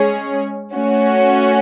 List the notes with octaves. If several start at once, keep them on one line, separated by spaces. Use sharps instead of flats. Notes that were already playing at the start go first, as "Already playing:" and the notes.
Already playing: G#3 C#4 G#4 C#5
A3 C#4 F#4